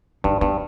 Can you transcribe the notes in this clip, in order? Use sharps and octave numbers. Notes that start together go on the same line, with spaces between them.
G2 D#4
G2 B3